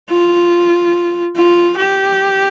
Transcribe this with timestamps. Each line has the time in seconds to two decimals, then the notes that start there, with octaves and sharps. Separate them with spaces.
0.10 F4
1.36 F4
1.77 G4